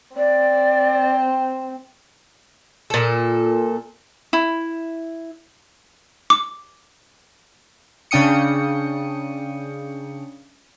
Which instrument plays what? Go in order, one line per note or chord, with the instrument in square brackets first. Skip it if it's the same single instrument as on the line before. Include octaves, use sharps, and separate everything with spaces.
[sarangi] C4 [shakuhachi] D5
[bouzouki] A#2 A4
[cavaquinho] E4
[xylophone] D6
[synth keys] C#3 D4 G5 D#6 C#7